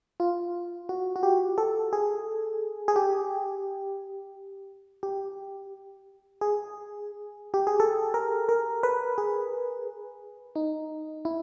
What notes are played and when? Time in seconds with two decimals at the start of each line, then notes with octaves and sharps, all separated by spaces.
0.20 F4
0.89 F#4
1.16 F#4
1.23 G4
1.58 A4
1.93 G#4
2.88 G#4
2.96 G4
5.03 G4
6.41 G#4
7.54 G4
7.67 G#4
7.80 A4
8.14 A#4
8.49 A#4
8.83 B4
9.18 G#4
10.56 D#4
11.25 E4